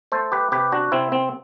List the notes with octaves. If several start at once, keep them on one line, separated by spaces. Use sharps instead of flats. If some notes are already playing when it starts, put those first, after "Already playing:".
A3 A4 C5
G4 B4
C3 G4 B4
D4 F#4
C3 C4 E4
C4